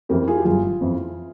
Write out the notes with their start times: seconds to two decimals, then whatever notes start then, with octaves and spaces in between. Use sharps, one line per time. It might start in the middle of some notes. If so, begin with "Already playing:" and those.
0.09 F2 E3 G4 A#4
0.28 F4 G#4
0.38 G4
0.45 G1 F4 G#4
0.81 F2 E3